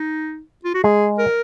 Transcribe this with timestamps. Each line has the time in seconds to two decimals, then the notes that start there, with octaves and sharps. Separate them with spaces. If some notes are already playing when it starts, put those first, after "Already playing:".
Already playing: D#4
0.65 F4
0.74 F#4
0.83 G#3 G#4
1.18 A#4